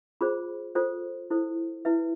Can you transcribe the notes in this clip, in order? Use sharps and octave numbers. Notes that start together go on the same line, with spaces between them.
F4 G#4 C5 B5
F4 A4 C5
E4 A4 C5
E4 B4 E5